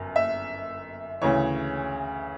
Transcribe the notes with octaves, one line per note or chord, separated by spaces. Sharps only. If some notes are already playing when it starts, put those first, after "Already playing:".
Already playing: G1 F#2
E5
D2 C#3 E3 C#5